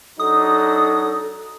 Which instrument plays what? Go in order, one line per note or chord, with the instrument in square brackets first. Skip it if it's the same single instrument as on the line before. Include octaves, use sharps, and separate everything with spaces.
[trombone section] F#3 D4 D#4 [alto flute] A4 [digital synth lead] D#6